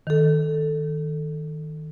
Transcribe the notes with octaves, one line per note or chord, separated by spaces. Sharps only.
D#3 A4